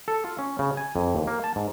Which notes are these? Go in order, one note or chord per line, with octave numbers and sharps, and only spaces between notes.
A4
F4
C#4
C#3
G#5
F2
D#2
A#3
A5
G#2